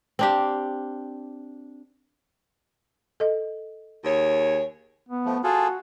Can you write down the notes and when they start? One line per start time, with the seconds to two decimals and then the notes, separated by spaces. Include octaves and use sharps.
0.19 C4 D4 G4
3.20 A4 D#5
4.05 D#2 G#4 C#5
5.09 B3
5.26 F3 A3
5.44 F4 F#4 G#4 A4